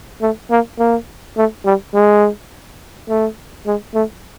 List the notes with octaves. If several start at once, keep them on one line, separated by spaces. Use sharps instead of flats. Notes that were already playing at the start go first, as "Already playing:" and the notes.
A3
A#3
A#3
A3
G3
G#3
A3
G#3
A3